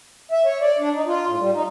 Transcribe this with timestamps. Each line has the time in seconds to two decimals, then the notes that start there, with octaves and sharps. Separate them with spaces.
0.31 E5
0.45 C#5
0.61 D5
0.79 D4
0.94 D#4
1.07 F4
1.27 A2
1.39 G3
1.53 D#4